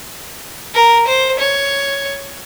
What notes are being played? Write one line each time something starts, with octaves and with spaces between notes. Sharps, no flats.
A#4
C5
C#5